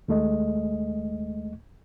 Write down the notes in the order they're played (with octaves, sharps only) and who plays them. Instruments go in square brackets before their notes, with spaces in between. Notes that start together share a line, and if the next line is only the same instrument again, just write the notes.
[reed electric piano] D#2 G#3 A3 D#5